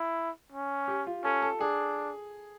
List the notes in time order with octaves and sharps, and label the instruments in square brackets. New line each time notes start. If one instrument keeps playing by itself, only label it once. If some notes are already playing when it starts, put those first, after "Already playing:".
Already playing: [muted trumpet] E4
C#4
[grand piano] G4
F4
[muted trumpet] C#4 [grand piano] A4
[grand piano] A4
[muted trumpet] D4 [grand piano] G#4